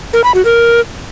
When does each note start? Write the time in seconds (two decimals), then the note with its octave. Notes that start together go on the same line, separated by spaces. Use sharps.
0.13 A#4
0.24 B5
0.35 F#4
0.45 A#4